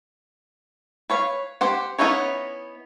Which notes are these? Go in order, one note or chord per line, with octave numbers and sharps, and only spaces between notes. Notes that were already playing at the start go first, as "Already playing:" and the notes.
B4 C#5 F5
G4 C5 F#5
B3 C#4 D#4 E4 C#5